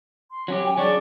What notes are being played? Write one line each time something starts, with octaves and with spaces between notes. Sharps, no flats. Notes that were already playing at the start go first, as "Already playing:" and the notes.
C6
F#3 C#4 G4
G5 G#5
F#3 C#4 D4 G#4 D5 C#6